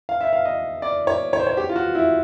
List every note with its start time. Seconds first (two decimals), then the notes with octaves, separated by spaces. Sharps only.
0.09 F5
0.21 E5
0.33 F5
0.45 D#5
0.82 D5
1.07 C#5
1.33 C#5
1.39 C5
1.47 C#5
1.57 G4
1.69 F4
1.76 F#4
1.95 E4